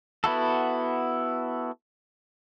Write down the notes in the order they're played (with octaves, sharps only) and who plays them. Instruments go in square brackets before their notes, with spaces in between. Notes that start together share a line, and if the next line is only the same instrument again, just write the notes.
[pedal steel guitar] B3 E4 F#4 A4